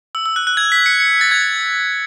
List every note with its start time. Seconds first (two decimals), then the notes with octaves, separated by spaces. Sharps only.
0.15 E6
0.26 E6
0.36 F#6
0.47 F#6
0.57 G#6
0.72 B6
0.86 C#7
1.00 C#7
1.21 A6
1.31 G#6